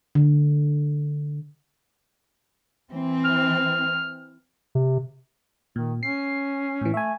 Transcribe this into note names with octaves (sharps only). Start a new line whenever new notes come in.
D3
E3 C4
F6
C3
A#2 D#3
C#4 C7
A2 E3
A3 E5 G#5